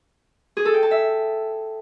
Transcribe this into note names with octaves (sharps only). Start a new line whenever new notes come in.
G#4
A4
G5
A5
E5